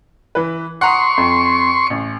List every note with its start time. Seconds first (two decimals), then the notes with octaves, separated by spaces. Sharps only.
0.35 E3 B4
0.81 F#5 A#5 C6 C#6 D#6
1.18 F2
1.87 A1 C#7